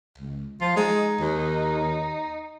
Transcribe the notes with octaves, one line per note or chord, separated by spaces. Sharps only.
C#2
F3 F4
G#3 D#4
D#2